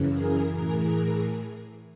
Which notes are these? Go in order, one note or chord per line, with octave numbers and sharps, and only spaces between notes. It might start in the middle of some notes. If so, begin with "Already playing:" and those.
Already playing: F#2 C#3 E3
G#4 A#4
A2 E3 G#4 A#4